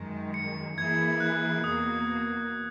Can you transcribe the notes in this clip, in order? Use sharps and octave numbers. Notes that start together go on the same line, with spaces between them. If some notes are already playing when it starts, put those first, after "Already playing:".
Already playing: F#2 D#3 G#3
C#7
E3 A#3 E4 G#4 G#6
F#6
E2 B2 A#3 D#6